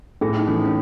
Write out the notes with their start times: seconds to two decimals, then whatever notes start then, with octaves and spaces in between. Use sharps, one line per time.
0.21 A2 G#4
0.36 D#4
0.48 E3 C#4
0.66 C#4